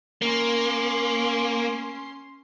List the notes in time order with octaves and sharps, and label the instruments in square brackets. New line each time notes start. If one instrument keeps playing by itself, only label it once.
[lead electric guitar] A#3 [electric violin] C#4 C6